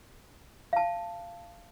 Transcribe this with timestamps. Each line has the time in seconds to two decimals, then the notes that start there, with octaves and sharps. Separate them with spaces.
0.73 F5 A5